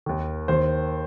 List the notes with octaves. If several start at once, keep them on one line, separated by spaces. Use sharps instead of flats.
D#2 D#3
D#2 D#3 C5